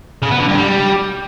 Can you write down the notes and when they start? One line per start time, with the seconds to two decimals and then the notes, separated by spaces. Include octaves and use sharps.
0.23 C#3
0.31 B3
0.40 D3
0.48 G2
0.57 G3